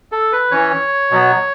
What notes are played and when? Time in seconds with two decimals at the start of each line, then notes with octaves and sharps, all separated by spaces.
0.12 A4
0.32 B4
0.51 E3 C#4 C#5
1.11 B2 F#3 B3